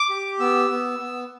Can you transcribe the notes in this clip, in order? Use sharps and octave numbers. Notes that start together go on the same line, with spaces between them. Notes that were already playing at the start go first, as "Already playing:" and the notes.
Already playing: D6
G4
B3 E6
B3
B3